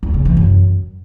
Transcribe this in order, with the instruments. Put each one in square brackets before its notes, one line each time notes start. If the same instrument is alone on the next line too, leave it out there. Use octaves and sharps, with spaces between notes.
[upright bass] E2
C#3
E3
F#2